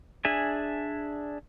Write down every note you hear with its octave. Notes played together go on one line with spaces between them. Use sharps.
D4 G#4 E5 G#5